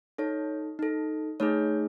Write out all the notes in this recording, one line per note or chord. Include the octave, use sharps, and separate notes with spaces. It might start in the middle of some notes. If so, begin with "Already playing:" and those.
D#4 A4 C#5
D#4 A4
A3 D#4 G#4 C#5